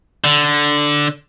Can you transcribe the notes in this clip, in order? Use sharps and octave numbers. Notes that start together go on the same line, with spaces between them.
D3